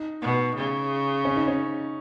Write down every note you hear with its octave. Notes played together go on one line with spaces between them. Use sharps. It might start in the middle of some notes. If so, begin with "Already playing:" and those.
Already playing: D#4
B2
C#3
C#4
D#4
C#4